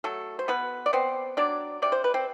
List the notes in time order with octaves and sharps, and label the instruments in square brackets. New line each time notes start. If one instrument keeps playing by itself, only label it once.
[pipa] F#3 A3 A4
C5
B2 B3 B4
D5
B3 C4 C5
F#3 D4 D5
C3 D5
C5
B4
C4 C5